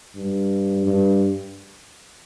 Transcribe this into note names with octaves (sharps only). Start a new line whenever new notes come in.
G2
G2